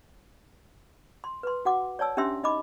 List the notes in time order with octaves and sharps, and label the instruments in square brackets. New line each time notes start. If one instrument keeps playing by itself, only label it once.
[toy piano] C6
B4 C6
F#4 F#5 D6
C#5 D5 A5 E6
C#4 D4 G4 E5 C6 E6
D#4 D#5 B5 D6